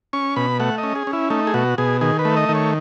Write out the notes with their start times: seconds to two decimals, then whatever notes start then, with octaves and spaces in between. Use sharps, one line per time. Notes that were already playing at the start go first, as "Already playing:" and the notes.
0.13 C#4 C#6
0.36 B2 B5
0.60 A3 F#5
0.78 D#5
0.83 C#4
0.95 G#4
1.07 C#4
1.13 E4
1.30 A3 D#4
1.47 G#4
1.54 B2 F#4
1.78 B2 G#4
2.01 D#3 G#4
2.19 B4
2.25 A3
2.37 D#5
2.49 D#3
2.55 C#5